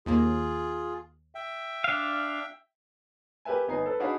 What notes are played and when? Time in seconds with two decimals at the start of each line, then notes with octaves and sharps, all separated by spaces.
0.06 D#2 A#3 F4 G#4
1.35 E5 G5
1.84 D4 F5
3.45 G4 A#4 B4 E5 G#5
3.68 G1 B3 D#4 G#5 A#5 C7
3.86 A4 B4
4.00 D4 D#4 F#4 G#4 F5 B5